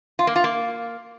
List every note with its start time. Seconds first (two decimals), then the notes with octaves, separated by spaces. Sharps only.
0.19 F4
0.27 A#3
0.36 F4
0.44 A#3